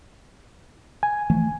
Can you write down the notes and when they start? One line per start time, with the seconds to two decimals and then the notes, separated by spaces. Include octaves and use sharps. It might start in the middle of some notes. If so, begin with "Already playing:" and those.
1.03 G#5
1.30 E3 F3 A3